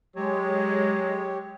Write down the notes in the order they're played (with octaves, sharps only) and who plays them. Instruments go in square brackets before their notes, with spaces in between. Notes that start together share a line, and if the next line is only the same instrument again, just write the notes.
[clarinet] F#3 [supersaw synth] G#3 [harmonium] G4 C#5